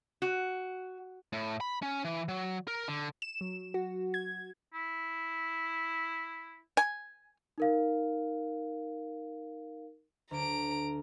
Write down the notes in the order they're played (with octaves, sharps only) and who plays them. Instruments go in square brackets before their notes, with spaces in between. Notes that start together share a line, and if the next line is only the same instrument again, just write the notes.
[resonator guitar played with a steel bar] F#4
[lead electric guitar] A2
B5
C#4
E3
F#3
A#4
D3
[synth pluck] E7
F#3
F#4
G#6
[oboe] E4
[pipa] G#5
[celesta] D#4 A#4 F5
[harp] D2 [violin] A#5 D7